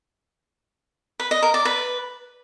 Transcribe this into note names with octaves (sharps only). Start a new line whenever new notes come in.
B4
D#5
A#4
D5
B4